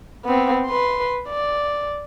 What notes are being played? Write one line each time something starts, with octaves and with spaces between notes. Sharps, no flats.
B3 C4
B4 C6
D5